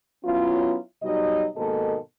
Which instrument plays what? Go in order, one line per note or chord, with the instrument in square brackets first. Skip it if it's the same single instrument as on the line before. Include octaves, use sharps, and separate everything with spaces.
[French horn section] F#3 B3 C#4 E4 F4
B2 F#3 G3 D#4 D#5
G#2 B2 D#3 A#3 A4 D#5